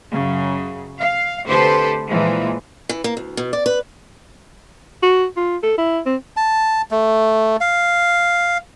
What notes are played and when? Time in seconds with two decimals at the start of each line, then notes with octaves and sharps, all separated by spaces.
0.14 F#2 C#3
0.99 F5
1.48 D2 C3 G4 A4 B4 C5
2.07 A#2 E3 F3 G#3
2.89 E3
3.04 A#3
3.17 D2
3.37 B2
3.53 D5
3.66 B4
5.03 F#4
5.37 F4
5.63 A4
5.78 E4
6.06 C4
6.37 A5
6.91 A3
7.60 F5